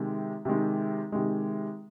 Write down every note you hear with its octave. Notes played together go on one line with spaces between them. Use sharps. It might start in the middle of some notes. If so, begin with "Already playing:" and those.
Already playing: C3 D#3 G#3
C3 D#3 G#3
C3 D#3 G#3